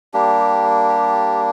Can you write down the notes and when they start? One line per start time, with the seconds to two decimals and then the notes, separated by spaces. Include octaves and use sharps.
0.13 G3 A#3 D4 G4
0.89 G4